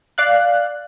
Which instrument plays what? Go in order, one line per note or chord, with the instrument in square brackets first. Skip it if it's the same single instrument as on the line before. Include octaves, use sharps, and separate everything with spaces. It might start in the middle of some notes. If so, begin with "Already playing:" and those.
[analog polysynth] D5 F5 F#6